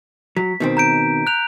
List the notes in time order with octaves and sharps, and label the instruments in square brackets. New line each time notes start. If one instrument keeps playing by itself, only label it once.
[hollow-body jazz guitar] F#3 [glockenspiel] B6
[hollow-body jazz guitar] B2 D#3 C4
[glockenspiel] A#5 G6 D7
F#6 G6 F7